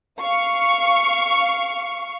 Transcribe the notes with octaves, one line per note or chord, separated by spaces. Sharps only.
F5 C#6